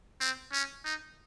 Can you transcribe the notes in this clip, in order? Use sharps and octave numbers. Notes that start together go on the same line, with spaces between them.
C4
C#4
D#4